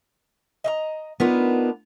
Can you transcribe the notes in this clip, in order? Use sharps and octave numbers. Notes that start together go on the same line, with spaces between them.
D#5 E5 A#5
B3 D4 D#4 F4 A#4 B4